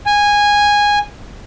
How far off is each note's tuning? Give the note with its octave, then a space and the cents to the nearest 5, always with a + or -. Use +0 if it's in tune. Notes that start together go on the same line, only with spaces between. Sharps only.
G#5 -10